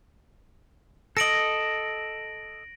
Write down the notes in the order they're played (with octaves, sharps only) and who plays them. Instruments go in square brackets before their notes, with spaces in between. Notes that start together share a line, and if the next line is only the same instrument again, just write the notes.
[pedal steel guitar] A4 D#5 [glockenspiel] A#6 D7 F#7